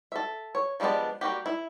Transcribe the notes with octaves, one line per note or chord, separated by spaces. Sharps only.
A4 E5
C#5
F3 G3 G#3 B3 D4
G3 A#3 F#4 G4
E4